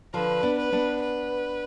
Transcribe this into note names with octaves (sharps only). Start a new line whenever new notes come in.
D3 F3 B4
B3 D4
B4
B3 D4
B4